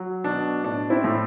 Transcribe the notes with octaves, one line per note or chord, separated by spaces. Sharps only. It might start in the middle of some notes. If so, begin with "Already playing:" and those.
Already playing: F#3
B2 D4
A2 D4
C4 E4
A2